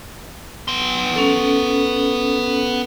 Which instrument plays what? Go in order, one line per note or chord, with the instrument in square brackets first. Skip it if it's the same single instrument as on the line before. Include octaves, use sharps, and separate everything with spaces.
[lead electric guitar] B3 C6
[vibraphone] C#4 A4